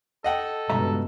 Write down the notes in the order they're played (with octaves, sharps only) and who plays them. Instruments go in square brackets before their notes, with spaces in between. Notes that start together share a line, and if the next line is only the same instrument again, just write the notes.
[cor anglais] A4 [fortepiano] D#5 F#5 G5
[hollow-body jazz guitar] C#2 E5 A#5 [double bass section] G2 B2